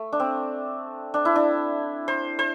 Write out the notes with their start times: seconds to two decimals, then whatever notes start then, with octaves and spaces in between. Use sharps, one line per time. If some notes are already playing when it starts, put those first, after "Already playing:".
Already playing: A3
0.13 D4
0.20 C4
1.14 D4
1.25 E4
1.36 D4
2.08 C5
2.39 C5